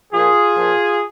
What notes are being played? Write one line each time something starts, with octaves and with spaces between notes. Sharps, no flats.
A#2 F3 F4 G#4
A#2 F3